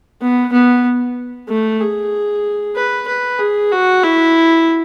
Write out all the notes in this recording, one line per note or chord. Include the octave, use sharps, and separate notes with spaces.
B3
B3
A3
G#4
B4
B4
G#4
F#4
E4